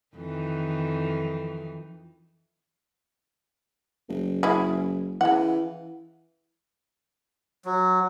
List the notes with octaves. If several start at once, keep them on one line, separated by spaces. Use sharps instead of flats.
F2 D#3 E3
F#1
C#4 E4 G#4
C#3 E3 F#5
F#3